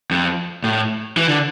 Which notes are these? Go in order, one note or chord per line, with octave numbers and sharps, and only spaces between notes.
F2
A2
E3
D3